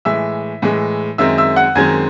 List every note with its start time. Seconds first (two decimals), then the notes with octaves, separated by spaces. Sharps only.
0.05 A2 E3 G#3 E5 E6
0.62 A2 E3 G#3
1.18 F#2 D#3 G#3 C4 E5 E6
1.38 E5 E6
1.56 F#5 F#6
1.75 F#2 D#3 G#3 C4 G#5 G#6